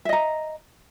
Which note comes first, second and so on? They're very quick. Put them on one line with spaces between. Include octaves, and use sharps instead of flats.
E5 D#5 A#5